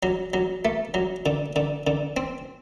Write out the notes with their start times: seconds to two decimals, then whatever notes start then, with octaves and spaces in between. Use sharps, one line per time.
0.03 F#3
0.34 F#3
0.65 A3
0.94 F#3
1.26 D3
1.56 D3
1.87 D3
2.17 C4